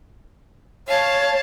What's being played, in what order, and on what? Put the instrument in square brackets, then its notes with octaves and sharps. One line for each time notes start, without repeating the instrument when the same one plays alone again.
[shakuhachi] C#5 [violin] F5 A5